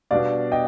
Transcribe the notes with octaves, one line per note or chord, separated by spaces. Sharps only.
B2 G3 B3 D4 D5 F5
D#5 G5